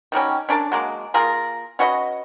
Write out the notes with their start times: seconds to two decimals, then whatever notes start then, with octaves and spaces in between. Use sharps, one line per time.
0.12 D#3 F#3 G3 C#4
0.49 C#4 D4 A#4 A5
0.72 F#3 G#3 A#3
1.14 A#3 F4 G#4 A#4
1.79 C#4 F#4 B4 D#5